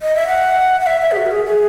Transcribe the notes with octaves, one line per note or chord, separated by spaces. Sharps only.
D#5
E5
F#5
F#5
E5
E5
G#4
F#4
A#4
G#4
G#4